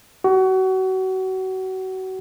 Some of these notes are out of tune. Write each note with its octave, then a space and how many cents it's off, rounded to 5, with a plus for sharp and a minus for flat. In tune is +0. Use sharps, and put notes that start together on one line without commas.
F#4 +30